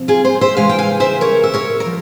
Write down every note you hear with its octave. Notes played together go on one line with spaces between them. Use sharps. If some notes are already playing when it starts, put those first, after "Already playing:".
Already playing: C3 F3 C4
F4 G#4
G#4 C5
C5 E5
C#3 E3 G#3 F5 G#5
G5
F5 G#5
C5 E5
A#4 C#5
E5
A#4 C#5
A#4
F3